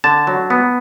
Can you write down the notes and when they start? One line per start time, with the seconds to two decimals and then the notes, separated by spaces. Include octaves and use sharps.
0.04 D3 A5
0.27 F#3
0.50 B3